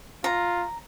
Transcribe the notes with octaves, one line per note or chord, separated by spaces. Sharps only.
F4 A#5